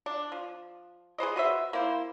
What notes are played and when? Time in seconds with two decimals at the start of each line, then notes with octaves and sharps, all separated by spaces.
0.06 D4
0.32 F3
1.18 G#4 B4 C5 D#5
1.36 F#4 B4 C5 E5
1.73 A#3 C4 E4 C5